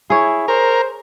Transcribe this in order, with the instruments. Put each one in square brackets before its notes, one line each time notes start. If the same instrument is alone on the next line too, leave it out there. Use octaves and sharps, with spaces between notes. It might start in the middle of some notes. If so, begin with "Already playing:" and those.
[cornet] E4 [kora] G#4 C#5
[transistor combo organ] A#4 [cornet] C5